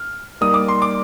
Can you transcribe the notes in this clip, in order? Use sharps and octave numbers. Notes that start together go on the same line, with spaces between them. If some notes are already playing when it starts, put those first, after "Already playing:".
Already playing: F6
G3 A#3 D#4 A#4 D5 D#6
D6
C6
D6